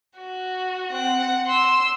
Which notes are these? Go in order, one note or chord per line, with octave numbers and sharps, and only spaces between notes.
F#4
C4 F#5
C6 E6